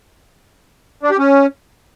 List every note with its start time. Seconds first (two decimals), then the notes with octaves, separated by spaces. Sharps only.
1.03 D4
1.11 G4
1.18 C#4